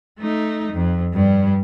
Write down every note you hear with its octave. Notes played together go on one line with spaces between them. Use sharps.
A3 D#4
F2
G2 G3